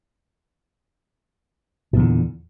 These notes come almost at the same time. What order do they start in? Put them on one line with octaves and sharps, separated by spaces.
A#2 E2 D3